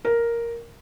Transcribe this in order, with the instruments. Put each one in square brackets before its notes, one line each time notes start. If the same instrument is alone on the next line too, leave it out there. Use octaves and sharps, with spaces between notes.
[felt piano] A#4